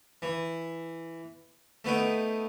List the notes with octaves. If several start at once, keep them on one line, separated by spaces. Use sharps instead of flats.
E3
A3 B3 D#4 G5